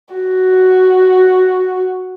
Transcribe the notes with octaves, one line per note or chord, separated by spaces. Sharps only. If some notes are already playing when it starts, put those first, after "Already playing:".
F#4